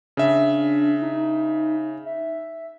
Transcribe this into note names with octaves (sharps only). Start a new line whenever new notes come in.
C#3 D4 E5
D#4
E5